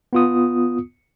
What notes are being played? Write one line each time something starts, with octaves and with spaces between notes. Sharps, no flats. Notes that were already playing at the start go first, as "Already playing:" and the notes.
B3 F4 D#6